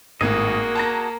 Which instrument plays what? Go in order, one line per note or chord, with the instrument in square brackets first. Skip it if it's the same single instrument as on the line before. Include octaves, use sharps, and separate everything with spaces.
[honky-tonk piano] G#1 A2 [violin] A#3 [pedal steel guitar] F#4 G#4 D#5
[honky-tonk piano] A5 A#5 A#6